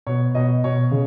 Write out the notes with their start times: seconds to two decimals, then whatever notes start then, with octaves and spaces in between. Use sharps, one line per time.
0.07 B2 C#5
0.35 B2 D#5
0.64 B2 C#5
0.91 C#3